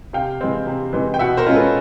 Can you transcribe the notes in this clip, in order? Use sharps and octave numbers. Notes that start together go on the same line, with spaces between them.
C3 F5 G5
E3 G#3 C4
C3
E3 G#3 C4
G5
B2 E5 F#5
A#4 C5
G#3 C#4 F4
A4 B4